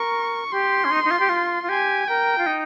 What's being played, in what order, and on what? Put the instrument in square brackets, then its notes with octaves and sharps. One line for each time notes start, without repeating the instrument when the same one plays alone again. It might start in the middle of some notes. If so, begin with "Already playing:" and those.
Already playing: [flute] A#4 [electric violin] C#6
[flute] G4 [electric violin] C6
[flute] C#4
D#4
D#4
F4
G4
F4
F4
[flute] G4 [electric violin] G#5
[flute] A#4 [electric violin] G5
[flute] F4
D#4